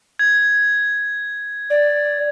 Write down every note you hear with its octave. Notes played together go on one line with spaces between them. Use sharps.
G#6
D5